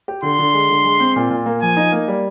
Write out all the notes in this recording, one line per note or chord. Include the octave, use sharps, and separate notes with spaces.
G4
D3 C6
D3
G#3
D3
G#3
C4
A#2
A#2
A#3
F3 G#5
D#4
A#3
G3